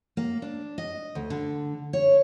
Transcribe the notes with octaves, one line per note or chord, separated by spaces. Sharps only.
A#3
D4
D#5
D2
D3
C#5